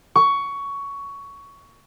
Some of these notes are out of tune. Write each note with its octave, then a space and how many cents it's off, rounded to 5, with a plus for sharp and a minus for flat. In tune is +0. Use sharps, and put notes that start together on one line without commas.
C#6 +15